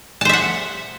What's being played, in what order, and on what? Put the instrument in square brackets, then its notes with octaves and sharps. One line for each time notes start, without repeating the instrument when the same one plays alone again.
[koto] A5
C5
E5
F#5